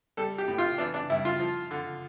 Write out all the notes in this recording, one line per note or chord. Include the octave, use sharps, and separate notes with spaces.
G3 A4
G4
A2
F4
E3 D4
D4
G2 E4
F4
F3
D3